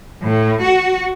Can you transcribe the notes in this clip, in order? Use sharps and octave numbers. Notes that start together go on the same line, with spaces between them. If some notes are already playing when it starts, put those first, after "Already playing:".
A2
F#4